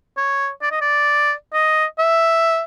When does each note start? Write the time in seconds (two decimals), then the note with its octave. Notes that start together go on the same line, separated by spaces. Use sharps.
0.17 C#5
0.62 D5
0.71 D#5
0.81 D5
1.53 D#5
1.99 E5